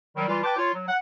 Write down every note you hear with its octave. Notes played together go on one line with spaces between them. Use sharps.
D#3 F#3 G3
E3 G3 F4
B4 G5 A5 D6
F4 C#5
F#3
F#5